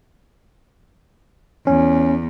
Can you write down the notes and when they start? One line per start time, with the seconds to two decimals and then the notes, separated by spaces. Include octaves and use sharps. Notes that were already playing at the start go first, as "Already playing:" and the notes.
1.67 E2 C#4